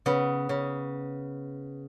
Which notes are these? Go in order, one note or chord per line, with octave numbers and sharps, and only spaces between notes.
C#3 B3
C#3